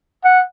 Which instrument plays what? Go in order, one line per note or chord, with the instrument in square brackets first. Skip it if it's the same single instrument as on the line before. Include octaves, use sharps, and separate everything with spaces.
[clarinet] F#5